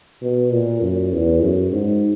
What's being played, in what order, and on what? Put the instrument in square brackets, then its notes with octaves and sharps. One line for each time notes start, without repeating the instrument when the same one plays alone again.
[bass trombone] B2
A#2
F#2
E2
F#2
G#2